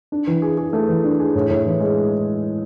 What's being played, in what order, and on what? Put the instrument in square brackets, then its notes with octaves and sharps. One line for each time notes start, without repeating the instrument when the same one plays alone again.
[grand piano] D4
E3
G#4
G#4
A3
E3
D4
G#4
A2
A2
E3
G#3